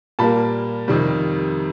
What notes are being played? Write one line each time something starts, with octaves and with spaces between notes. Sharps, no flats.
A#2 G3 A#3 A5 B5
F2 C3 D#3 G3